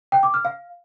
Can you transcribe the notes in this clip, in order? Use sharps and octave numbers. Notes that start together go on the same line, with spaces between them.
G5
D6
F6
F5